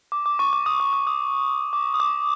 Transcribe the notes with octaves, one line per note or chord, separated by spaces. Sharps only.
D6
D6
C#6
D6
D#6
D6
D#6
D#6
D6
D#6
D6